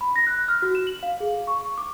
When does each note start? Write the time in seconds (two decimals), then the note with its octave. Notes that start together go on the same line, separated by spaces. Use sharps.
0.01 B5
0.16 A#6
0.27 F#6
0.48 F6
0.62 F#4
0.75 E7
0.87 F#7
1.03 F5
1.20 G#4
1.47 C#6
1.78 D6